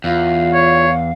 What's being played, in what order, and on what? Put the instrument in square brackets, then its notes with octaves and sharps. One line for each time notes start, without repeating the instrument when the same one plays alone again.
[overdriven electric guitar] E2 [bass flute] F4 [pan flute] F5
[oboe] C#5